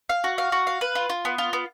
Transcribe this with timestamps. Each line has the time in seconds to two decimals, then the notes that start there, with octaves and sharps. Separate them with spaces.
0.09 F5
0.24 F#4
0.38 F5
0.52 F#4
0.67 F5
0.81 B4
0.95 F4
1.09 F4
1.25 B3
1.38 F4
1.53 B3